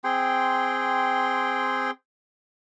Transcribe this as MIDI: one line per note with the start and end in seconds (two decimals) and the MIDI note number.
0.04 1.91 60
0.04 1.91 68
0.04 1.91 79
0.04 1.91 84